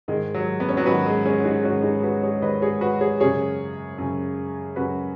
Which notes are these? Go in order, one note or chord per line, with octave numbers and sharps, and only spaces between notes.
G#2 D#3 G#3
F#3
B3
C#4
F#3 B3
G#2 D#3 F#4 B4
G#3
G#3 C#4
D#4 G#4
G#2 D#3 C#4 F#4
D#4 G#4
F#4 B4
G#4 C#5
G#2 D#3 B4 D#5
G#4 C#5
F#4 B4
G#4 C#5
F#2 C#3 G#4 C#5
F#2 C#3
F#2 C#3 F#4 B4